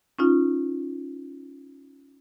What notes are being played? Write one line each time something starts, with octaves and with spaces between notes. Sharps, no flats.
C#4 D#4 F4